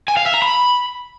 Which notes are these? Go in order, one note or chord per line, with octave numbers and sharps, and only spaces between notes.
G#5
F5
E5
A#5
B5